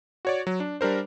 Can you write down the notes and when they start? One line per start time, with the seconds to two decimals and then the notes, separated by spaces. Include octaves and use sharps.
0.25 F#4 C#5 D5
0.47 F#3
0.60 D4
0.81 G3 D4 A#4 C5